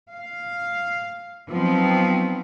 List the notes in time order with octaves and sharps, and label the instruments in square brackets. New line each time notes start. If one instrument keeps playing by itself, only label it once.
[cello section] F5
F3 F#3 B3 C4 D#4